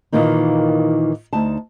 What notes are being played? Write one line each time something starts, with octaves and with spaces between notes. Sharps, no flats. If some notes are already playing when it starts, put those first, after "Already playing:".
A#2 D#3 E3 A#3 D#4
D2 D#4 A5